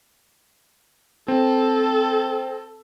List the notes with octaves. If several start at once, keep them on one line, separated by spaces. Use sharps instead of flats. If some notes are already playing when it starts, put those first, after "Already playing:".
C4 A4